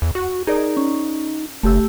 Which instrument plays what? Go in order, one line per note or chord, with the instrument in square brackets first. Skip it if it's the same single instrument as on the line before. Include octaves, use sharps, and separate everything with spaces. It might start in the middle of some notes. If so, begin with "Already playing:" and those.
[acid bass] E2
F#4
[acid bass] D#4 [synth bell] G#4 A#4 D5
[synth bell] C#4
[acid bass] F#1 [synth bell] A3 G4 E6